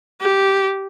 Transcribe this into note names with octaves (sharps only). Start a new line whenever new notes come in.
G4